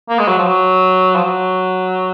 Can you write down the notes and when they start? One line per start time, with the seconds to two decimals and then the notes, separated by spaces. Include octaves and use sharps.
0.09 A#3
0.19 G#3
0.28 F#3
0.39 F3
0.47 F#3
1.15 F3
1.24 F#3